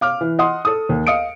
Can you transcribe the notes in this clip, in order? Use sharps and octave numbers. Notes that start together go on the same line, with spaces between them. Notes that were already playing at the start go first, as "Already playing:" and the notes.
F5 D6 F6
E3
D#5 F#5 C6 D#6
A4 D#6
D#2
D#5 F5 D#6 C#7 D7